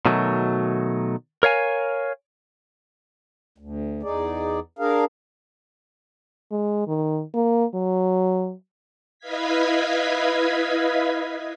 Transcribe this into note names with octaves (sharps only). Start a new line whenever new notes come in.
B2 D#3 F#3 A3
A#4 C#5 F5 G#5
D2
E2 D#4 G#4 D5
D4 G#4 A#4 F5
G#3
D#3
A#3
F#3
E4 B4 D#5 F5 G#6 B6